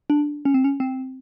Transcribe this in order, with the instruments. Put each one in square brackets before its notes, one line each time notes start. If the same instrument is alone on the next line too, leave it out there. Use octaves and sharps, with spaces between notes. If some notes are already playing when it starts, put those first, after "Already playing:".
[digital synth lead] D4
C#4
C4
C#4
C4